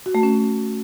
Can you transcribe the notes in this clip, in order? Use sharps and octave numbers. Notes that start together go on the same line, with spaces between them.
F#4
A3
C#4